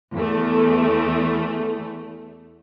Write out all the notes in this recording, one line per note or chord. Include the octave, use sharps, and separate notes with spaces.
E2 A3